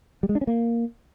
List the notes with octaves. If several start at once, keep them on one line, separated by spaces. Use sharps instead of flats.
G3
G#3
D4
C#4
A#3